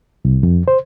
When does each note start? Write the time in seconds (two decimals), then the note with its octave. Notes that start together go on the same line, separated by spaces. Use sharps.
0.25 C2
0.43 F2
0.68 C5